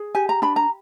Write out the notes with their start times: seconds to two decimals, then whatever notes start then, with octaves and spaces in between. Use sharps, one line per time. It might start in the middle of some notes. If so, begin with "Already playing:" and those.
Already playing: G#4
0.15 G4 G#5
0.29 A#5
0.42 D4 B5
0.56 A#5